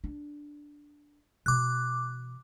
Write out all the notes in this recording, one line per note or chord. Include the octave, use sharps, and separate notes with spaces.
D4
B2 E3 D6 F#6